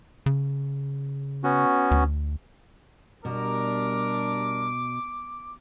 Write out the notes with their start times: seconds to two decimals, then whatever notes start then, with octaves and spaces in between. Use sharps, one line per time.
0.26 C#3
1.44 B3 C#4 F#4
1.91 D2
3.25 B2 G3 D4 A#4 D6